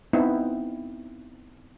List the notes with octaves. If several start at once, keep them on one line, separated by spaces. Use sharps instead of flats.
B3 C4 D#4 E4